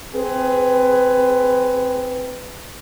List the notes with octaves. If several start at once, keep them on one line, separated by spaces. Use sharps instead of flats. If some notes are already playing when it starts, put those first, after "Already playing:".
C4 G#4 B4